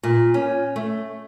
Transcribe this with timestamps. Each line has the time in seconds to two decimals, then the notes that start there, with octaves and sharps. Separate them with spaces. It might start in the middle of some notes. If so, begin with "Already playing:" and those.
0.03 A#2
0.34 C#4
0.76 A3